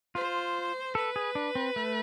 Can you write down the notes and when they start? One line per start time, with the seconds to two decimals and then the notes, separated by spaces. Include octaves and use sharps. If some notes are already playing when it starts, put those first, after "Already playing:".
0.15 F4 C5
0.95 A4 B4
1.16 G#4
1.35 D4
1.55 C4
1.76 A3